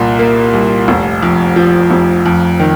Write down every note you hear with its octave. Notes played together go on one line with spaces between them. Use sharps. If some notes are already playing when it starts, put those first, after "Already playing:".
Already playing: C2 A#2
A#3
C2
F1
F2
F3
F1
F2
D#3